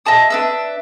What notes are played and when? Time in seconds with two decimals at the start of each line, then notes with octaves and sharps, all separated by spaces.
0.06 D#5 E5 A5 D#6
0.30 D4 B4 E5